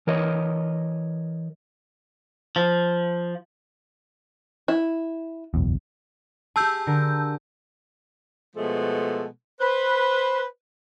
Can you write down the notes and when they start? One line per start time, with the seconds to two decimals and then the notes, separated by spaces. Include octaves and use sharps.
0.07 E3 A#4 C#5 D#5
2.56 F3
4.68 E4
5.54 F#1 B1 E2
6.56 G4 G#4 A5 E6 G6
6.87 D3 A#4
8.56 B2 F3 G#3 A3 B3 A4
9.60 B4 C5